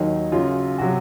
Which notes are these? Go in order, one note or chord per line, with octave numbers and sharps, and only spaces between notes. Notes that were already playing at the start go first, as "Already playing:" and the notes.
Already playing: D#2 D#3 F#3 D#4
F#2 C#3 F#3 F4
C3 F#3 F#4